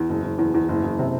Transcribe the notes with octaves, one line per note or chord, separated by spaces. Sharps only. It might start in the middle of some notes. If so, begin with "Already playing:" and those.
Already playing: E2
F#1
F#1
E2
E2
F#1
F#1
C3